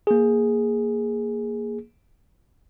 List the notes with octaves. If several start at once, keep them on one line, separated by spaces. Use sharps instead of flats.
A#3 G#4